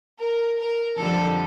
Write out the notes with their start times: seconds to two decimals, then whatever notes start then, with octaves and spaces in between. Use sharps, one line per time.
0.18 A#4
0.59 A#4
0.98 F2 D3 G3 A4